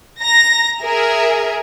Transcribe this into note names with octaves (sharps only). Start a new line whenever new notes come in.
A#5 A#6
G#4 A#4 E5